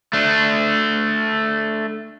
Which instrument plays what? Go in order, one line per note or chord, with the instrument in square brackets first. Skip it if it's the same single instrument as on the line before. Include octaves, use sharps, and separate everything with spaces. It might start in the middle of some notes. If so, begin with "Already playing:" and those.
[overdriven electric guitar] A3 D4